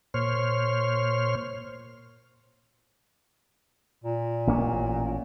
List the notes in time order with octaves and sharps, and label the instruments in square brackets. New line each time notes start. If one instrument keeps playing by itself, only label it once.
[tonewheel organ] A#2 C5 C#5 F6
[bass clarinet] A#2
[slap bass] A1 A#3 C#4